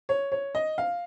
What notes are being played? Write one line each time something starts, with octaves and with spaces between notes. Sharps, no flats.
C#5
C#5
D#5
F5